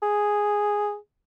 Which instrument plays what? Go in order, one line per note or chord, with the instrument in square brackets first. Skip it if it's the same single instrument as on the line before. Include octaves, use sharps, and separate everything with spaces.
[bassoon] G#4